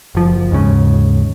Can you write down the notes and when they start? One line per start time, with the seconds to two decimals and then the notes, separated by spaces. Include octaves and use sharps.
0.15 F#1 F3
0.51 D#2 G#2 C#3